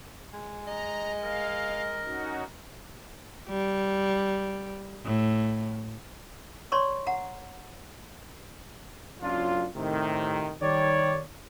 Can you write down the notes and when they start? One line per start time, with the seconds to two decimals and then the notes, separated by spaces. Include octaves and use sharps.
0.33 G#3
0.67 D#5 A#5
1.23 A#4 F5
2.04 C#4 D#4 F#4
3.49 G3
5.04 A2
6.72 C#5 D5 A#5 C6 C#6
7.07 F#5 A#5
9.22 F#1 F#2 F#3 D4 F4
9.76 A2 C3 D#3
10.62 D#3 G3 C#5 D5